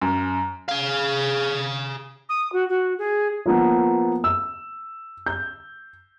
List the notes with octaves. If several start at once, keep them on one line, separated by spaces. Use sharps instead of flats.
F#2
G#4 F5
D#6
F#4
F#4
G#4
F3 A#3 B3
E6
G6